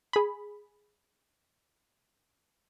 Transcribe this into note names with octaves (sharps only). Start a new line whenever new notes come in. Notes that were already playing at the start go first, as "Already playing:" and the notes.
G#4 B5